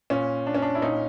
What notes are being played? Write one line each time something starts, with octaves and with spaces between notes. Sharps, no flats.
A#2 C#4
D4
C#4
D4
E4
A#2 C#4 D#4